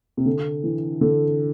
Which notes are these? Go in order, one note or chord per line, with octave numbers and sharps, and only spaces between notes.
C3
D3
E3
D3